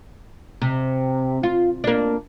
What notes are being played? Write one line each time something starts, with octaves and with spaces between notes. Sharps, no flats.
C3
F4
A#3 D4